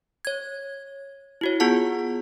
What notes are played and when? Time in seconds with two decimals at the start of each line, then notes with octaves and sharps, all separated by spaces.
0.25 C#5 G#6
1.41 E4 F#4 C#5
1.60 B3 F4 G#4 F#5 A5